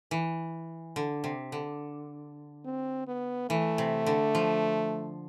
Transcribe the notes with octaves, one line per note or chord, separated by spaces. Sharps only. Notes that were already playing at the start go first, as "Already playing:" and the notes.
E3
D3
C3
D3
C4
B3
E3 A3
C3
D3
F3